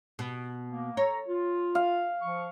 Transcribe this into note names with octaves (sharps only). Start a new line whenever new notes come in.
B2
A#3
A4 C#5 A#5
F4
F5
F3 C#6